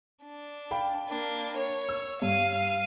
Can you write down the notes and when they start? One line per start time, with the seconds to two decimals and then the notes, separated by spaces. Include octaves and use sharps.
0.23 D4
0.71 F5 G5 B5
1.09 A#3 D4
1.57 C#5
1.89 E6
2.22 G2 F5 D#7